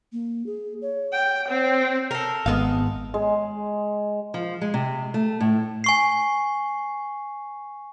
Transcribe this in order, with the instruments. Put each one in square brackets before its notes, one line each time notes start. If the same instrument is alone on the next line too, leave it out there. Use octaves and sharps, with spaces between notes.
[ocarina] A#3
G#4
C#5
[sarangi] G5
C4
[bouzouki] A4 A#4
[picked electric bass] G#1 [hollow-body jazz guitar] G#3 B3 F5
[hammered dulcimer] G#3
[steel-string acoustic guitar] F3
G#3
C3
A3
A2
[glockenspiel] G#5 C#6 C7